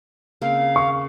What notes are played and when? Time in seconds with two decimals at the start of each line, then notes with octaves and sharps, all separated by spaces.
0.42 C#3 A#3 C4 F5
0.76 C#6